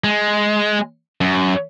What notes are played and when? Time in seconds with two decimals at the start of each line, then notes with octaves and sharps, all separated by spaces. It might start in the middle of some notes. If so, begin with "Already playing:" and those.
0.04 G#3
1.21 F#2